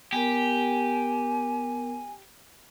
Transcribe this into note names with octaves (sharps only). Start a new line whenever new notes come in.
B3 G4 A#4 G#5